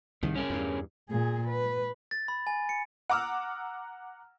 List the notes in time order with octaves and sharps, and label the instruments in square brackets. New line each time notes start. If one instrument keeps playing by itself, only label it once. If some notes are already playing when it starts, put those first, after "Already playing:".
[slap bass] C2 G#2 [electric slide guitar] D#3
[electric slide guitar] C#4 G#4 A#4
[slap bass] E2 G2
[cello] A#2 G#4
B4
[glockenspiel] A6
B5
G#5
C#7
[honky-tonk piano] F#5 A#5 D6 E6 F6